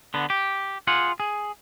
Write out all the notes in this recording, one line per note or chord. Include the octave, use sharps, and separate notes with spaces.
D3 B3
G4
F4 G#4 F#5
G#4